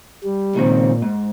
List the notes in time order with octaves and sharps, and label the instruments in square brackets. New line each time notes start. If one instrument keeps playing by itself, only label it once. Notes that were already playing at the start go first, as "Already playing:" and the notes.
[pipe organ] G3
[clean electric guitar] C#2 D#3 C4 [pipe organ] A#2
[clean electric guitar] G#2